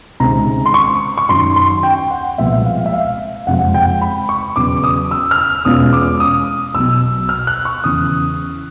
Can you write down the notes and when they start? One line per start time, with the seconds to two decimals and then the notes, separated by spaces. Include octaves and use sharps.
0.20 C#2 C3 D#3 G#3 C4 A#5
0.66 C6
0.74 C#6
1.18 C#6
1.29 F#2 D#3 F#3 C6
1.56 C6
1.83 G5
1.99 G5
2.11 F#5
2.38 C2 A#2 F3 G#3 B3 E5
2.65 F5
2.86 E5
2.93 F5
3.47 F#1 F2 C3 F3 G#3 F#5
3.74 G5
4.01 B5
4.29 C#6
4.56 E2 C#3 F#3 D6
4.84 D#6
5.11 E6
5.31 F6
5.38 E6
5.65 E2 B2 G#3 C#4 F4 D#6
5.93 D6
6.20 D#6
6.75 B1 B2 F#3 E6
7.29 F6
7.47 F#6
7.65 C#6
7.84 E2 C#3 E3 D#6